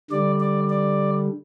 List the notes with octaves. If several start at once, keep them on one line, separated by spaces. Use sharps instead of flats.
D3 G3 D5
D5
D5